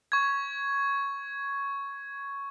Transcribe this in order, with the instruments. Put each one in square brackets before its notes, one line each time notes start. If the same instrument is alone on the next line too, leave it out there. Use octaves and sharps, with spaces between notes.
[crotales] C#6 G#6